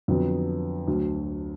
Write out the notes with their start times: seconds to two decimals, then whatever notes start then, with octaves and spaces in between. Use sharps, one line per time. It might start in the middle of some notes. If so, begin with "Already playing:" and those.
0.08 F2 D3 F#3 B3
0.87 D2 D3 F#3